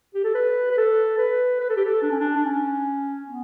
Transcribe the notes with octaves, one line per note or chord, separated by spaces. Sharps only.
G4
A4
B4
B4
A4
B4
B4
A4
G4
A4
D4
C#4
D4
D4
C#4
B3